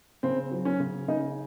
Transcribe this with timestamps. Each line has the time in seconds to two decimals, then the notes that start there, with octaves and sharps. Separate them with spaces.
0.23 C#3 C4
0.51 F#3
0.65 C#4
0.80 C#3
1.08 C#3 D#4